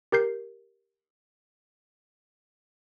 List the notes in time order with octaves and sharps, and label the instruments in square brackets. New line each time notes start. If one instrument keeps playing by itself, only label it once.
[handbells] G4 A#4 G6 C7